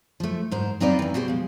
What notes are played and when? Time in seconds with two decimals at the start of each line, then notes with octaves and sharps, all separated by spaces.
0.20 F3 A3
0.51 G#2 A#4 C5
0.80 C4 D#4 F4 B4 C5 D5
0.99 D#3 E3
1.14 B2 G4 G#4 C5
1.28 F3 G#3